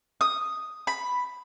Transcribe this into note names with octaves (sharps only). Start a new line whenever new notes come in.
D#6
B5